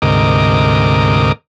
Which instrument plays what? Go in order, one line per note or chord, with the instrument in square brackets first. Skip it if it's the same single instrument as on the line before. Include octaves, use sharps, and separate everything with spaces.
[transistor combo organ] D2 G#2 C3 A#4 D#5 D6